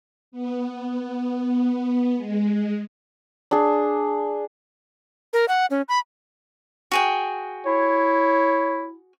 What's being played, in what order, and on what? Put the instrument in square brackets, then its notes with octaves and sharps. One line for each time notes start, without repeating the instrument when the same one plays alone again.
[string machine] B3
G#3
[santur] D4 G#4
[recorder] A#4
F#5
C#4
B5
[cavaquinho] F#4 G#4 G5
[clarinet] E4 [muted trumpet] C#5